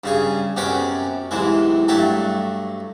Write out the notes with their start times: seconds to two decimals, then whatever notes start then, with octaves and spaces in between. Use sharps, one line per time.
0.04 G2 C#3 G#4
0.56 F#2 C3 B3 C#4 D5 G5
1.31 B1 C3 E3 G#3
1.88 G2 F#3 A3 G4 A4